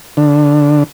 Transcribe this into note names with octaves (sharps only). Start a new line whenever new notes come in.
D3